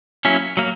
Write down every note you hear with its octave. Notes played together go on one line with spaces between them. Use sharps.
F#3 A#3 C#4 E4
F#3 A#3